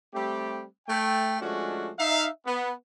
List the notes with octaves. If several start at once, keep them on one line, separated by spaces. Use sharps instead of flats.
G3 A3 C4 G4
A3 G5
F3 G#3 A3 C#4 D4 F#4
D#4 E5 F5
B3